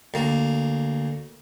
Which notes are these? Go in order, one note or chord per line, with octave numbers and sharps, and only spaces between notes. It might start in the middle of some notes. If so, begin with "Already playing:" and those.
D2 A#3